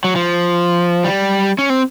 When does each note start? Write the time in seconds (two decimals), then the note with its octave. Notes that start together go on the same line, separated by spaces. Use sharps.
0.04 F#3
0.16 F3
1.04 G3
1.58 C#4
1.70 C4